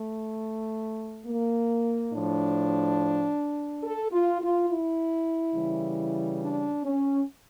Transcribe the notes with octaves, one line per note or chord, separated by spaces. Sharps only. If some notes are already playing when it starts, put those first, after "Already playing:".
Already playing: A3
A#3
A2 F3 D4
A4
F4
F4
E4
C#3 E3 G3
D4
C#4